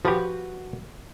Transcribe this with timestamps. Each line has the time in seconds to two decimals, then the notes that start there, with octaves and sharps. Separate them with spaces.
0.05 F3 F#4 G4 B4